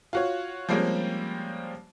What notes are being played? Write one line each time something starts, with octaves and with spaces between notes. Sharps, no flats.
F4 F#4 C#5
F3 G3 G#3 A#3 C4 C#4